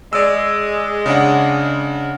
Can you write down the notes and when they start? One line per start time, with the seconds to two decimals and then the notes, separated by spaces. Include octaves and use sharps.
0.13 G#3 D5 E6
1.06 C#3 D4 F#5